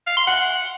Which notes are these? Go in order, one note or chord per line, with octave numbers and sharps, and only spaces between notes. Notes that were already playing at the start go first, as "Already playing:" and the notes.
F5
C6
F#5